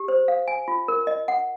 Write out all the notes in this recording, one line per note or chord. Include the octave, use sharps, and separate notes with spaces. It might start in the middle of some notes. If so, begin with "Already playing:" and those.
Already playing: G4
C5
F5
G#5
F4
A#4
D#5
F#5